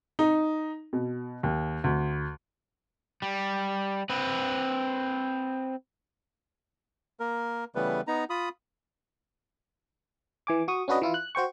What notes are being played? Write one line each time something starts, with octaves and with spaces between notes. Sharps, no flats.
D#4
B2
D#2
D2
G3
C4 B4
A#3 A#4
C#3 E3 G3 A3 B3 B4
B3 D#4 A#5
F4 B5 D#6
E3 G#5 D6
F#4 C#6 D#6
C#4 D4 F#4 B4 D#5
E3 E4 F4
F#6
F#4 C5 G5 C#6